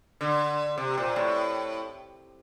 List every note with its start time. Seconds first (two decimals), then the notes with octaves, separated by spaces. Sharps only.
0.21 D3
0.78 C3
0.98 A#2
1.16 A2